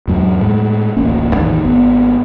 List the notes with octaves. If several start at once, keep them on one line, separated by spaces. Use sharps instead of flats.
E2 G#2 F#3 G#3
A2 G#3
D1 A1 A#3 C#4
A1 E2 D#3
G#1 B3